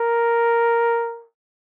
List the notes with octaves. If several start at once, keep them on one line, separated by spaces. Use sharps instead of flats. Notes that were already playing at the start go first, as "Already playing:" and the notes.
Already playing: A#4